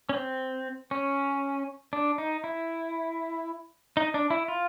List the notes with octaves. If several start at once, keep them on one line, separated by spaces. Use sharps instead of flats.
C#4
C4
C#4
D4
D#4
E4
D#4
D4
E4
F4